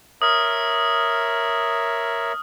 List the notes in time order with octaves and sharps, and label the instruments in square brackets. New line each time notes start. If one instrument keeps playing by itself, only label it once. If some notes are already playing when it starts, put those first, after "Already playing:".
[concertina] A#4 C#5 E5 [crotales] D#6 F6